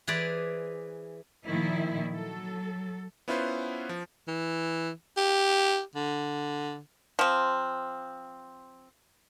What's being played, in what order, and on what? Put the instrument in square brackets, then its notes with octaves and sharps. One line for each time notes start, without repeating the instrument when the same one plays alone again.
[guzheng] E3 G#4 B4 C5 D5
[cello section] A#2 D#3 F3 E4
F#3 A4
[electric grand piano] B3 C#4 E4 F4 B4 C5
F3
[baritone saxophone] E3
G4
D3
[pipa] F3 C4